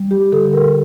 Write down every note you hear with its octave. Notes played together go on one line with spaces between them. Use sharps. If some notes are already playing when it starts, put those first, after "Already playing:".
Already playing: G3
G4
D3 A4
A#4